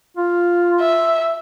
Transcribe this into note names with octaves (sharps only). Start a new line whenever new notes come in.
F4
E5